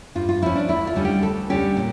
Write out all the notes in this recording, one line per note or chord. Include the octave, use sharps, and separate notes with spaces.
G2 F4
F4
F3 C#4 E4
D4
D2 E4
F4
D3 G3 C#4
G4
D2 A4
D3 G3 C#4 G4
A#2